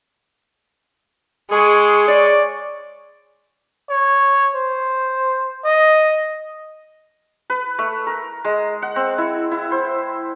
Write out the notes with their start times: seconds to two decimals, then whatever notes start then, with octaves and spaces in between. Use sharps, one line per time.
1.51 G#3 G#4 C#6
2.07 C#5 D5
3.90 C#5
4.55 C5
5.64 D#5
7.50 B4
7.78 A3
8.07 A#4
8.44 G#3
8.82 F#5
8.96 C4
9.18 E4
9.51 E4
9.72 C5